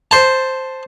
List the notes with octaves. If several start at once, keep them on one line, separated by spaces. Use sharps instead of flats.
C5 A5